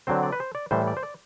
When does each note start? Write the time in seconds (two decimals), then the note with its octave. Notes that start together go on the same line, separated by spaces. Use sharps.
0.07 D3 F#3 C4 C5
0.23 D5
0.32 B4
0.40 C5
0.55 D5
0.71 A2 E3 G3 C5
0.87 D5
0.97 C5
1.03 D5